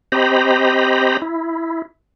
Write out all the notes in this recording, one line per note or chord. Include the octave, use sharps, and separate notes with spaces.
C4 G4 C5 D#5 A#5 B5
E4